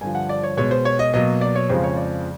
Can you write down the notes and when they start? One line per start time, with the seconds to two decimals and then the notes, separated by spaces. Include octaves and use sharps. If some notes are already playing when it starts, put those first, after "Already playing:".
0.01 G2 D3 F3 G#5
0.15 F#5
0.29 D5
0.43 C#5
0.57 B2 G#3 C#5
0.71 C5
0.85 C#5
0.99 D#5
1.13 B2 F#3 A#3 D#5
1.41 D5
1.56 C#5
1.69 F2 C#3 F3 G#3 C5
1.84 C#5
1.97 D5